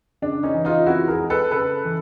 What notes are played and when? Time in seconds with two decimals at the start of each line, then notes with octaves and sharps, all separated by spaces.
0.22 C#3 D4
0.43 C#4 D#4
0.54 E3
0.65 D#4 F4
0.86 F2 E4 F#4
1.08 G#4 A#4
1.20 G#3
1.30 A4 B4
1.51 C#3 A4 B4
1.85 E3